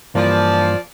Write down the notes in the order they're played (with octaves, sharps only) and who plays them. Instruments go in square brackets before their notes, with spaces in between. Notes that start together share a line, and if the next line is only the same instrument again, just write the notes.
[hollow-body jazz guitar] G2 E3 A#3 [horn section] F3 D5